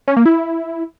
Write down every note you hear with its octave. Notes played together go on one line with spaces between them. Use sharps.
C#4
A#3
E4